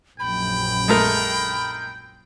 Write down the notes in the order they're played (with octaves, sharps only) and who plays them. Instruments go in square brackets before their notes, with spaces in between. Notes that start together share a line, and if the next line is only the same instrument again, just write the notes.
[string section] A#1 F#2 [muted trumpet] G5 [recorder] B5
[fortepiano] G#3 A3 A#4